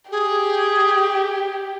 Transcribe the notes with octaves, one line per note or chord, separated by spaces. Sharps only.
G4 G#4